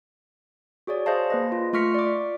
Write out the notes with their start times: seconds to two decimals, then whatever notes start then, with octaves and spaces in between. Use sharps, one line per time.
0.87 F#4 G#4 C#5 D5
1.06 G#4 C5 D#5 F5 A5
1.30 A#3 B4 D#5
1.52 F4
1.73 A3 F4 C#6 F6 B6 C#7
1.94 D5 D6